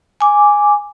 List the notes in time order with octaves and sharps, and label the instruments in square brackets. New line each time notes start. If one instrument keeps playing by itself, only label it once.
[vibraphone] G#5 D6